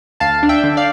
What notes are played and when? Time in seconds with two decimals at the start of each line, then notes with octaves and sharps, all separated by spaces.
0.20 D2 F5 A5
0.43 D4
0.49 E5 G5
0.63 D3
0.77 D5 F5